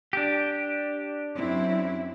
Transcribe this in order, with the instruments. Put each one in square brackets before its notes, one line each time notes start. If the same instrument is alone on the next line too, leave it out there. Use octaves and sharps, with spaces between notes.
[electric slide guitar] D4 G4
[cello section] F#2 C4 E4